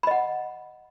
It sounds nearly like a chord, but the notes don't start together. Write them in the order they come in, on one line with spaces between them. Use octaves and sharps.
B5 D#5 F#5